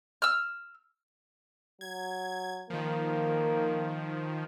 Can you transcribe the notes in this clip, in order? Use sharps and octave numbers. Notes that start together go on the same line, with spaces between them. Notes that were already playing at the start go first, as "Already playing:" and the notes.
E6 F6
F#3 G#6
D#3 F3 A#3